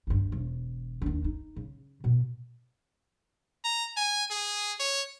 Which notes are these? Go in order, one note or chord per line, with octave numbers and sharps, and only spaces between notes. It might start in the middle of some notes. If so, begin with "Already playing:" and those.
G#1 G2
E1
D#2 D4
D#4
C#3
B2
A#5
G#5
G#4
C#5